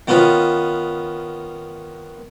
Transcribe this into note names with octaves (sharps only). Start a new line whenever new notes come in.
D#3 B3 C#4 F4 B4